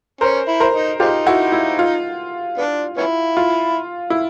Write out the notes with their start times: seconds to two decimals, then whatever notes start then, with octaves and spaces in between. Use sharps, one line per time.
0.21 C#4 A#4 C5
0.48 E4
0.60 A#4 C5
0.73 D#4
1.00 G#3 C4 D#4 F4 G4
1.26 E4 F#4
1.52 E4
1.79 F4
2.57 B3 D4
2.97 B3 C#4 E4
3.37 F4
4.10 E4